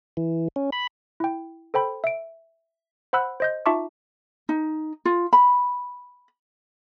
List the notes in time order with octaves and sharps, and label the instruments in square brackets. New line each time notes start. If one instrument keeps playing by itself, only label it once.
[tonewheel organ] E3
C#4
B5
[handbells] E4 G5
A4 C5 G5 B5
E5 D7
C5 F#5 B5 E6 F#6
C5 D#5 G6
D#4 F4 E5 A5 C#6 D6
[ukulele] D#4
F4
B5